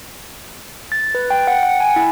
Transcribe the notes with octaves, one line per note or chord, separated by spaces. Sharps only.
A6
B4
G5
F#5
F#5
G#5
E4